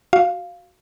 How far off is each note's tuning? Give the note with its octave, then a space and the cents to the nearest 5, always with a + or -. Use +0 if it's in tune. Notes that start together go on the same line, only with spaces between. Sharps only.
F#4 +0 F5 +0